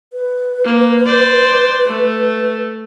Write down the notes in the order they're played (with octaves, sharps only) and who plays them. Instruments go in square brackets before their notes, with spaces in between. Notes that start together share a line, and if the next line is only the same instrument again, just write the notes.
[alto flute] B4
[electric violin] A#3
C5 D5
A3